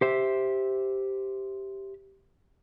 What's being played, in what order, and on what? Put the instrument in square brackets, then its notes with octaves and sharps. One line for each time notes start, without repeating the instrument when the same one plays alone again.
[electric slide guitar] G4 C5 E5